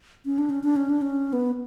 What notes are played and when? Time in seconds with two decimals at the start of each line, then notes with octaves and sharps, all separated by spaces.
0.25 C#4
0.38 D4
0.50 C#4
0.63 D4
0.76 C#4
0.89 D4
1.02 C#4
1.33 B3